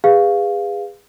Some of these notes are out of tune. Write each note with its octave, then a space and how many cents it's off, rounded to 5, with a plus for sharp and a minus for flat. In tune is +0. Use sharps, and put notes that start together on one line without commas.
G#4 -30 B4 +0 F5 +0